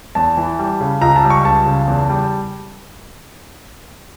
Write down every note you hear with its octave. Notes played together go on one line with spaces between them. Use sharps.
E2 A5
E3
G3
C#3
C#2 A#5
A5
G3
C#6
C#2 A5
C#3
E2
G3